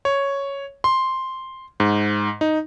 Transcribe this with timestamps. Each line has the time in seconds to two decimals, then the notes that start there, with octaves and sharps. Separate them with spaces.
0.05 C#5
0.84 C6
1.80 G#2
2.41 D#4